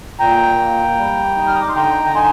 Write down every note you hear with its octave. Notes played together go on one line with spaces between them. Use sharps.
A#2 G5 A#5
A#3
G3
D#4
F6
D#6
D6
C6
D3 G5 A#5
A#5
D#4 G#5 C6